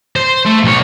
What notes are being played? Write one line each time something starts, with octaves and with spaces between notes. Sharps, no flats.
C5
A3
B1 C#5